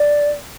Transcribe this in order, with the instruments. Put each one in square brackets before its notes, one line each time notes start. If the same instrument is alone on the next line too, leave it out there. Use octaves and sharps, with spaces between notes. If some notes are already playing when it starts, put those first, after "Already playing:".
Already playing: [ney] D5